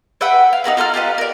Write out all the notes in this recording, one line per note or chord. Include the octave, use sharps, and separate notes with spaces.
B4 E5 F#5 G5
F5
D#4 G#4 A#4 F#5
F4 A4 A#5 F6
F4 G4 B4 D#5
A#4 D5